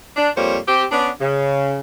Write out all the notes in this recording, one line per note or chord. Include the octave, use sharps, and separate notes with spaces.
D4
F2 G3 A#3 C5 C#5
C4 G4
B3 C#4 D4
C#3